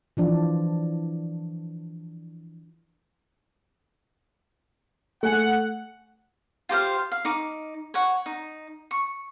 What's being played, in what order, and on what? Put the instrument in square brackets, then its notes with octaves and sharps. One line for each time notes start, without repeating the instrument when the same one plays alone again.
[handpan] E3 F3 D4
[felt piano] A3 G#5 [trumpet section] F#5
[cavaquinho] F4 G4 C5 F5
F5
D#4 D6
C#5 F#5
D#4
C#6